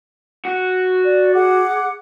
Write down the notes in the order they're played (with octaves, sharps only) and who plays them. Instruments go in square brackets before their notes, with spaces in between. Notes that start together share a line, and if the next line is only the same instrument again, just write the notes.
[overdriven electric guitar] F#4
[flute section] D5
G#4 F#5 D6